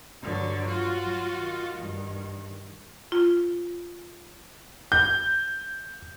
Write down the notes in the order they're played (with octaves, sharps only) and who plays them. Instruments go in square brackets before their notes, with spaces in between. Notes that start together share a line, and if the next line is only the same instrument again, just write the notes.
[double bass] G2 F#3 [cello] D3
[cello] F4 F#4
[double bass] F#3
D#3
[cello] G2
[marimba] F4
[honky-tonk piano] G6